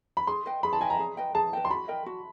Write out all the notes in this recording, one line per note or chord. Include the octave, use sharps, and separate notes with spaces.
B5
G#4 C6
B4 D#5 G5
G#4 B5
A5
B4 D#5 G5 G#5
A#5
G#4
B4 D#5 G5
G#4 A5
B4 D#5 G5
C6
F#4 B5
A#4 D#5 G5
F#4